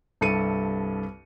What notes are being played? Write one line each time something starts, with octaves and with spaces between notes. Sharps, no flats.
C2 G2 A4 C#7 D#7